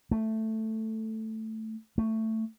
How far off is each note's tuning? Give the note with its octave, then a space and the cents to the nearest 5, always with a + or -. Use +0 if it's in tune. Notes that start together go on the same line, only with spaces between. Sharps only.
A3 +5
A3 +15